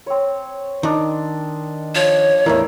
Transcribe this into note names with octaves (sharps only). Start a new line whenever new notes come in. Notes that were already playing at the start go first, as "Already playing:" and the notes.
C4 C#5
D#3 D4 D#5
F3 C#5
E2 A2 E3 A#4 D5 E5